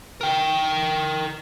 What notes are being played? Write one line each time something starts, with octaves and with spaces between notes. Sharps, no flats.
A#4 G5